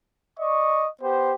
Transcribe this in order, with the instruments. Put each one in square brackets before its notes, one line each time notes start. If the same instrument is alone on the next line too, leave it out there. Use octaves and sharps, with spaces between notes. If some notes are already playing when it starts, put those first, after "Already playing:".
[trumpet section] D5 D#5 C#6
B3 G4 C5